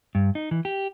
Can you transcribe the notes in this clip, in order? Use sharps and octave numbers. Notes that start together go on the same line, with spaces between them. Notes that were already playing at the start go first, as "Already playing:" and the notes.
G2
D#4
E3
G4